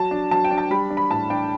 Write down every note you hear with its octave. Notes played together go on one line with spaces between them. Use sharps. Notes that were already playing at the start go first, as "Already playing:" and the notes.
Already playing: F#3 A5
D4
F#3 A5
G5
D4
A5
G3 B5
D4
B5
A2 A5
D4 G5